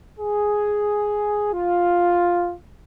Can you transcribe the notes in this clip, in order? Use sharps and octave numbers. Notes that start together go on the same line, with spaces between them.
G#4
F4